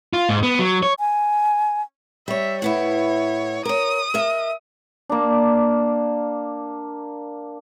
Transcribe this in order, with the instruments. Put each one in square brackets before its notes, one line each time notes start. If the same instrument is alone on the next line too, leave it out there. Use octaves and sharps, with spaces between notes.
[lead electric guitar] F4
G#2
B3
F#3
C#5
[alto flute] G#5
[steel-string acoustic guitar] G3 C#5 [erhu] E5
[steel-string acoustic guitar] A2 B3 E4 [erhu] C#5
[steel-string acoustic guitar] A#4 C#5 [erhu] D#6
[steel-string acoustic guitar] A#4 D#5 E5
[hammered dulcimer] A#3 D4